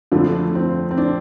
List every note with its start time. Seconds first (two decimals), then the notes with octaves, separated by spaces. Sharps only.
0.12 F2 D3 F3 A3
0.55 C4
0.91 C4
0.97 D4